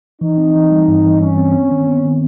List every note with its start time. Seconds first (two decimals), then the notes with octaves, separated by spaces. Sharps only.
0.21 E3 D#4
0.37 C4
0.55 E3
0.71 G3
0.88 G2
1.05 E3
1.20 G3 C#4
1.38 C4
1.54 B3
1.71 D#3
1.87 B3
2.04 D#3